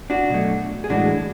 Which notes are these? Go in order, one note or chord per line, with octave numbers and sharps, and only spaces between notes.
D4 F#4
B2 F#3 A3
G#4
A2 E3 G#3 D4 F#4